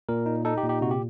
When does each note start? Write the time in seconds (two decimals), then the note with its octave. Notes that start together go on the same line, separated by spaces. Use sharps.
0.09 A#2 A#4
0.26 D#4
0.45 D#4 A4
0.58 G4
0.64 A#2
0.69 G4
0.81 C3 F#4
0.91 G4